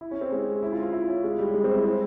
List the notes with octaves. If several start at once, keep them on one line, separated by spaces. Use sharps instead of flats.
E4
C#4
C4
G#3
E4
F4
F4
E4
C#4
G#3
G3
G#3
C4
E4
C4